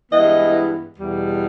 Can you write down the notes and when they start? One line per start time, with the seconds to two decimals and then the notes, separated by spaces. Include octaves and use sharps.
0.12 G2 E3 G#3 B3 E4 D#5
0.97 E2 B2 G3